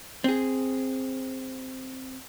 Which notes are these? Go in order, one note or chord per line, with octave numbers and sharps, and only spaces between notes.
C4 G#4